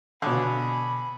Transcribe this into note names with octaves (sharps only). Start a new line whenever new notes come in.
B2 D3 G#4 C#5 B5 D#6